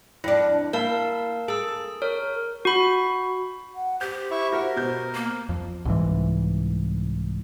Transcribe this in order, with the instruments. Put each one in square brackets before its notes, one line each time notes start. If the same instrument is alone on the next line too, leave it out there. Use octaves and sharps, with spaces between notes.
[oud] F2 D4 [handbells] E4
[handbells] A#3 F5 A5 [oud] E4 [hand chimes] A#4
[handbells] G#4 E6 [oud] A4
[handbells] A#4 [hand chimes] C#5
[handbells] F#4 B5
[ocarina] F#5
[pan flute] G4 [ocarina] C5 [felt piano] G6
[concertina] E4 E5 C#6
[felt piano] F#4 [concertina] A#4
[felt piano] B2 G6
[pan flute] A#3
[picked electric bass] F2
C2 G#2 E3